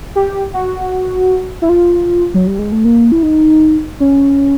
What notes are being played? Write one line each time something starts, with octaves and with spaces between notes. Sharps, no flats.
G4
F#4
E4
F4
F#3
G3
G#3
A3
A#3
E4
D#4
C#4